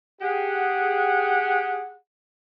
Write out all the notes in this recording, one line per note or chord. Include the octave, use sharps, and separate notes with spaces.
G4 G#4 F#5